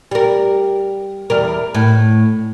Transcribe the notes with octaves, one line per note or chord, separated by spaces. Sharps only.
G3 A#4
E2 G3 A#4
A2